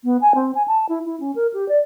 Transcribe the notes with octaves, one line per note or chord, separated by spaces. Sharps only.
B3
G#5
C4
G#5
A5
E4
E4
C#4
A#4
G4
D5